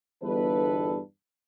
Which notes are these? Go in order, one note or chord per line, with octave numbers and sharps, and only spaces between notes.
G1 E2 G2 A4 B4